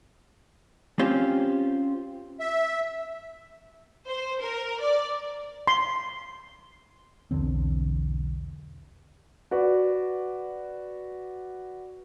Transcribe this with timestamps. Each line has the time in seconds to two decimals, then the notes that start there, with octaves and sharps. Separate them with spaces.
0.99 C4 C#4 F4 G4 C5
2.40 E5
4.08 C5
4.41 A#4
4.81 D5
5.67 C6
7.31 B1 E2 D3 C4
9.51 F#4 B4 D5